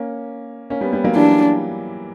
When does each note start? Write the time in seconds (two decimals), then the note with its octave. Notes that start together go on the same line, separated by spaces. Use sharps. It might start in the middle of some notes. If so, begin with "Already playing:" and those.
Already playing: A#3 C#4
0.70 A#3 C#4
0.81 G3 B3
0.93 G3 B3
1.04 F#3 A#3
1.15 E3 G3 D4